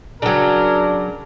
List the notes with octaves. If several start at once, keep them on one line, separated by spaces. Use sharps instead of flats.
C#3 F#3 D4 A#4